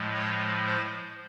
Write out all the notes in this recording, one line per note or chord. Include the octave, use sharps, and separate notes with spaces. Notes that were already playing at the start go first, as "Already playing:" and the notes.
Already playing: A2 F3 G#3
C#5
C5